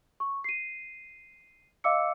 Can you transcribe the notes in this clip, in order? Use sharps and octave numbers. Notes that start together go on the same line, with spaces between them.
C#6
C7 D#7
D#5 F5 D6 E6 C#7